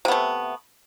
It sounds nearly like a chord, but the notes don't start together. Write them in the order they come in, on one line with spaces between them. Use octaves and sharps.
C3 B3 A3